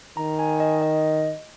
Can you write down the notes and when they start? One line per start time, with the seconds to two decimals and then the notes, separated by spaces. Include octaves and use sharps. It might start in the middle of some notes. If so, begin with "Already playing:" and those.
0.17 D#3 A#5
0.39 G#5
0.60 D#5
0.82 D#5